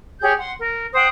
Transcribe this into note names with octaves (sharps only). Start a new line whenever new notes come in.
G4 G#4 C#5 G6
F#5 C6
A#4
C5 F#5 G5 D#6